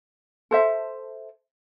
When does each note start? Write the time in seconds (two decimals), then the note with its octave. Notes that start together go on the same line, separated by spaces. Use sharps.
0.51 A4 C5 E5